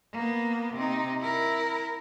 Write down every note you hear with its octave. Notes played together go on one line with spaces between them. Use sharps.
A#3 B3
C3 D#4
E4 A#4